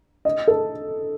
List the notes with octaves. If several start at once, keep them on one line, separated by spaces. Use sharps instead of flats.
D#5
A4